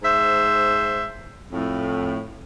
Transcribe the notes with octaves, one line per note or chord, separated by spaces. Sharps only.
G#2 C5 E5
F2 A2